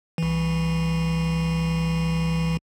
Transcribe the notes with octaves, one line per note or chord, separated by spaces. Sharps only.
C2 E3